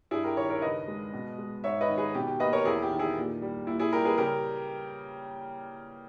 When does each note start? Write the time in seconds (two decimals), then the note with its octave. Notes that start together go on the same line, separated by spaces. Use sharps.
0.11 G2 E4 G#4
0.24 G4 A#4
0.37 D#3 A#4 C#5
0.50 A#4 C#5
0.62 C#3 B4 D#5
0.88 G#3
1.13 B2
1.38 G#3
1.64 G#2 C#5 E5
1.81 B4 D#5
1.89 D#3
1.98 G#4 B4
2.14 B2 G4
2.27 G4
2.40 A#3 B4 D#5
2.53 A#4 C#5
2.65 E2 E4 G#4
2.82 G4
2.91 D#3
2.99 E4 G#4
3.16 A#2
3.42 G3
3.67 A#2 E4
3.79 E4 G#4
3.93 G3 G4 A#4
4.05 G#4 B4
4.18 C#3 G4 A#4